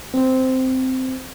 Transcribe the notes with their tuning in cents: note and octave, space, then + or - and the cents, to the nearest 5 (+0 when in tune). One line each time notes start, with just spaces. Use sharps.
C4 -10